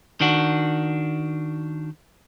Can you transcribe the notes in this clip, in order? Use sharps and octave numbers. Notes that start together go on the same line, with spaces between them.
D#3 D4 F#4